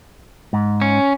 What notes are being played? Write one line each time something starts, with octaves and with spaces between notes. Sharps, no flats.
G#2
C#4